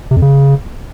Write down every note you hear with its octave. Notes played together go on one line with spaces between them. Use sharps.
C3
F2
C#3